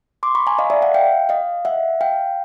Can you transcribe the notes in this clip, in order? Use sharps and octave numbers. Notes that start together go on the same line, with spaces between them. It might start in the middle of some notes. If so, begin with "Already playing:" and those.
C6 D6
B5 C#6
G#5 A#5
D#5 F5
D5 E5
E5 F#5
F5 G5
D#5 F5
E5 F#5
F5 G5